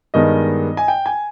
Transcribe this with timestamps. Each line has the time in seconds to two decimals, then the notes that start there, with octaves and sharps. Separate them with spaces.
0.14 G2 D#3 G#3 B3 D#5
0.77 G#5
0.88 G5
1.06 G#5